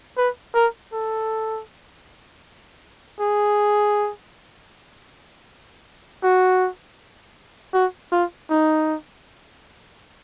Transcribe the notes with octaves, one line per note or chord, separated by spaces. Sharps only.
B4
A#4
A4
G#4
F#4
F#4
F4
D#4